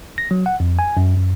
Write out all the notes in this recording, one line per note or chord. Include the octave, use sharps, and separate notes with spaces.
A#6
F#3
F#5
F2
G#5
F#2
F#2